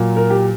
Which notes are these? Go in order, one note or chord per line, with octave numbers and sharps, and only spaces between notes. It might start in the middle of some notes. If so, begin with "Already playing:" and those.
Already playing: A#2 F#3 A#3
A#4
G4